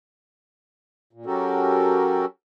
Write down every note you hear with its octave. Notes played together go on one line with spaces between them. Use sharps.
A#2
F#3 C#4 F#4 G4 A4 A#4